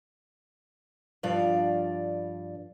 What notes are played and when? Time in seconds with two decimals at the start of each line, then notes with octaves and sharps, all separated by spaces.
1.23 G2 F3 D5 F5